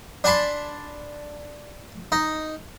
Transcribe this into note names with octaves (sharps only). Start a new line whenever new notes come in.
D4 G#5 A5 B5 C6
D#4